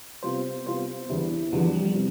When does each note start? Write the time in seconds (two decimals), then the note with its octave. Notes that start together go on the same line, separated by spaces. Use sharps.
0.23 C3 G3 B3 F4 C5
0.66 C3 G3 B3 F4 C5
1.09 E2 D3 G3 B3 E4
1.52 E2 D3 F3 G3 B3
1.63 F3
1.74 G3
1.85 G3
1.95 C3